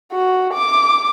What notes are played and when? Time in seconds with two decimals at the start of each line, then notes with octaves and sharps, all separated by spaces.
0.13 F#4
0.54 D6